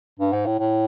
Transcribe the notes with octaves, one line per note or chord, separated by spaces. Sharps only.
G2
G#2
A2
A2